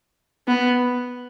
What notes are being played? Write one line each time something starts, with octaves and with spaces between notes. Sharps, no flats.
B3